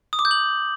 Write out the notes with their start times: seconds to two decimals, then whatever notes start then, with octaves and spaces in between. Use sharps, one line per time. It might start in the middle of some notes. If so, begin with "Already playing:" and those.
0.13 D#6
0.19 D6
0.25 G6
0.31 F#7